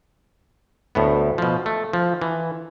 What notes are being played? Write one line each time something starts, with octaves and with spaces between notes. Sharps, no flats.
D2 A2 B3
B2 F3
A3
F3
E3